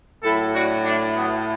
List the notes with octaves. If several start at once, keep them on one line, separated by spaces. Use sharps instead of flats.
A2 F#3 E4 A4
D4 F#4
A3 D4
F#3 B3